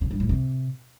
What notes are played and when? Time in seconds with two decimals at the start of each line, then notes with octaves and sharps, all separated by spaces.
0.01 C#3
0.11 G2
0.20 A2
0.29 C3